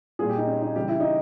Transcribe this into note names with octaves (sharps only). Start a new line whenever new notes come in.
A#2 G3 G#4
G4
D#4
C#4
D#4
C#3 E3 G3 G4
E4
D#4